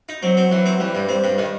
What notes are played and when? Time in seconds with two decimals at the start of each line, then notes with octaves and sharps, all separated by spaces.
0.09 D#4
0.23 F#3 C4
0.37 C4
0.51 E3 F#3
0.66 C4
0.80 E3 G3
0.95 G2
1.09 C4
1.24 G2
1.38 D#3